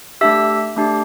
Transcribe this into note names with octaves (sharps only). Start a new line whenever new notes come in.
A3 D4 G4 E5 E6
A3 D4 G4